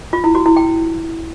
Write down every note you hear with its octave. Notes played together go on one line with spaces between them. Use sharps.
F4
E4
F#4
E4
G5